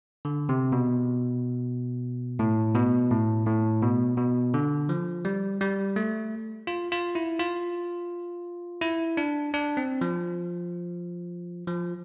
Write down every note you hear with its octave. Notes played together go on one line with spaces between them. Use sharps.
D3
C3
B2
A2
B2
A2
A2
B2
B2
D3
F3
G3
G3
A3
F4
F4
E4
F4
E4
D4
D4
C4
F3
F3